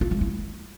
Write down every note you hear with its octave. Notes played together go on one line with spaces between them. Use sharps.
F4
G#3
E4